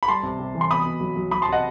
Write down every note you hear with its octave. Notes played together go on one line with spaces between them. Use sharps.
B5
G3 A5 C6
C3
C3
E3
C6
B2 B5 D#6
B2
F#3
F#3
F#3 B5 D#6
A5 C6
C3 D#5 F#5